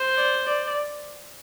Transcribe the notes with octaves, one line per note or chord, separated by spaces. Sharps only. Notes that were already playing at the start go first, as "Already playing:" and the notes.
Already playing: C5
D5
D5